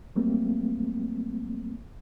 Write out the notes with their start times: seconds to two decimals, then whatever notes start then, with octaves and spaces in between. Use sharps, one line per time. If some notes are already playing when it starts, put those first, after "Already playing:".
0.16 F#3 G3 A3 A#3 C4